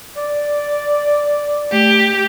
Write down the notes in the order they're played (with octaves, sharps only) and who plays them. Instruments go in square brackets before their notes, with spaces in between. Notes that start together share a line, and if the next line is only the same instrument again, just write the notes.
[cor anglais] D5
[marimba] A3 [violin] G4